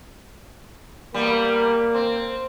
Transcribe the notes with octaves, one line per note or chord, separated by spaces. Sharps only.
G3 A#3 B3
C4